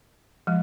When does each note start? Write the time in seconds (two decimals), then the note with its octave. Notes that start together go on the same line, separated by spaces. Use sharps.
0.47 F3 G#3